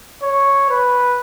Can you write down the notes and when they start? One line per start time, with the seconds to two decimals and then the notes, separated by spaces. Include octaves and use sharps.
0.23 C#5
0.70 B4